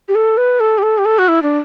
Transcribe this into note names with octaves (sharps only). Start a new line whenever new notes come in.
G4
A4
B4
A4
G4
A4
G4
A4
F#4
E4
D4